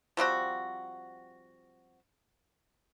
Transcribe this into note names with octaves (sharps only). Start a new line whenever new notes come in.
F3 G3 C4 F#4